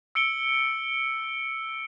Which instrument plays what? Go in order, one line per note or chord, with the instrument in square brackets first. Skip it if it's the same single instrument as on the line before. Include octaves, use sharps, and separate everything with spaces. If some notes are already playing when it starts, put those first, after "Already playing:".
[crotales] E6 C#7 D7 G7